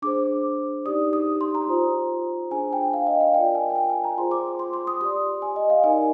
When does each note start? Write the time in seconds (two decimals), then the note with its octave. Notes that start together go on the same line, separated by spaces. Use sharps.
0.02 D4 G#4 C5 D6
0.85 D#4 G4 D5 D#6
1.13 D#6
1.41 C6
1.55 A#5
1.68 F4 C5
2.51 D4 G#4 C5 G#5
2.73 G5
2.94 F5
3.07 D#5
3.21 F5
3.34 F4 A#4 D5 G5
3.55 G#5
3.70 G5
3.76 G#5
3.90 G#5
4.04 A#5
4.18 F4 G#4 C5 C6
4.31 D6
4.59 C6
4.73 C6
4.87 D#6
5.01 G4 D5 C6
5.42 G#5
5.56 D#5
5.70 F5
5.84 D#4 A#4 D5 G#5